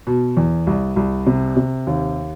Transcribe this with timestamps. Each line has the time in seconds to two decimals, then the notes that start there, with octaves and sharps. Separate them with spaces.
0.07 B2
0.37 E2
0.67 C2
0.96 C2
1.27 C3
1.57 C3
1.87 D#2